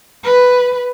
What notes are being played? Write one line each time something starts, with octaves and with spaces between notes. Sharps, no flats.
B4